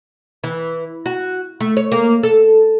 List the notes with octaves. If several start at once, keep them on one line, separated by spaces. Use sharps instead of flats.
E3
F#4
A3
C#5
A#3
A4